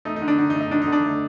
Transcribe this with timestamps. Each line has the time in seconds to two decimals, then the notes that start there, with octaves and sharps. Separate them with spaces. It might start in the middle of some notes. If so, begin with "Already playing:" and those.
0.05 A3 D#4
0.16 D#4
0.22 D3
0.28 D4
0.38 D3 D#4
0.50 D#4
0.55 A3
0.61 D#4
0.71 D3 D4
0.82 D#4
0.88 D3 D4
1.05 A3